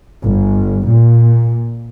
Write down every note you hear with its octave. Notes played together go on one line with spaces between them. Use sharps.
G1
A#2